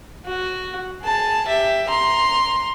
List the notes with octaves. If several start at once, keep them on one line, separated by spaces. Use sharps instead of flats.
F#4
G#4 A5
G4 E5
A#5 C6